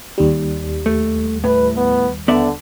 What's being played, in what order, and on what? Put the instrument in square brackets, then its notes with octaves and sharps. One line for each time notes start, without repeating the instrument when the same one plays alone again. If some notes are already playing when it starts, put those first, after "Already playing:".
[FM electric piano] D#2 G3
[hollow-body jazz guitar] A3
[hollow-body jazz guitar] A2 [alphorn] B4
[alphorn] B3
[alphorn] D3 [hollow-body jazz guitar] B3 D5 E5